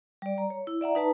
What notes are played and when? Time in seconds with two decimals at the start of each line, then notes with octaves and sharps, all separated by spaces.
0.22 G3 D5
0.38 A#5
0.50 C#5
0.67 E4
0.81 D5 E5 F#5 A#5
0.95 D#4 B4 A5 A#5